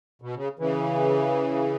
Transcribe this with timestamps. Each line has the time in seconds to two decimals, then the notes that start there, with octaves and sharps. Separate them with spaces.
0.22 B2
0.35 C#3
0.59 C#3 E3